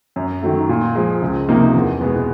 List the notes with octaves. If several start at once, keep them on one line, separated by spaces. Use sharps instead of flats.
F#2
D#3 F#3 A3
A#2
F3 G#3
C#2
C3 F3 A#3 D#4
E2
B2 G#3 B3